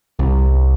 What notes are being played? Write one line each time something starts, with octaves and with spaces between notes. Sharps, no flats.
C2